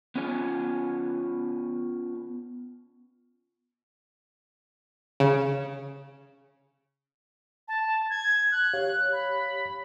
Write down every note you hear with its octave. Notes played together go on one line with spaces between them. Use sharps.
B3 C#4 F4 A4 G#5
C#3
A5
G#6
F#6
G4 C#5 F5
B5